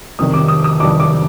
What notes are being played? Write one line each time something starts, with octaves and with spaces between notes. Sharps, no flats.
F1 F2 C3 D#3 G3 D#6
D6
D#6
D#6
F1 F2 C3 D#3 G3 D6
D6